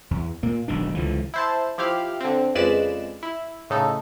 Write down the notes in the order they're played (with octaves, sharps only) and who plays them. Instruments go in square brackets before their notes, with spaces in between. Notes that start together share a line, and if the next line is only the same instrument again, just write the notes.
[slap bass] E2
A#2 A#3
E1 B1 D#3 D4
C#2 D3 E3 F3
[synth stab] E4 C5 A5
F3 E4 G4 F5
D3 C4
F2 C#3 G#3 B4 D5 E7
E4
A2 C#3 D#4 A4